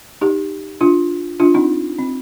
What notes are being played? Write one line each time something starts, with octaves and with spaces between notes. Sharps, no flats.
D#4 G4
D4 F4
D4 F4
C4 D#4
C4